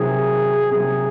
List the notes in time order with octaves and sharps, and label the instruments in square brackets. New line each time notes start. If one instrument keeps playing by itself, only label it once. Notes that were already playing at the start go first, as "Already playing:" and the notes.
Already playing: [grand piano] C3 D#3 F#3 [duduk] G#4
[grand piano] C3 D#3 F#3 [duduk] G#4